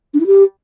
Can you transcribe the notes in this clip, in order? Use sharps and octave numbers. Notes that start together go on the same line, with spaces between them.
D4
E4
G4